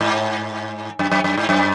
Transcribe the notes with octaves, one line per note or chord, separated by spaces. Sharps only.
G#2
F#2
F#2
F#2
G#2
F#2